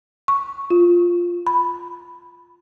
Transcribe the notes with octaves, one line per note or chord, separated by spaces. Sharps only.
C#6
F4
B5